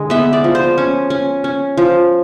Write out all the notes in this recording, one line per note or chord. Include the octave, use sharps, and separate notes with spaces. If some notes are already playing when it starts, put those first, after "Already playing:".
Already playing: D3 G#3
B3 E5
D5
F3
C5
C#4
C#4
C#4
F3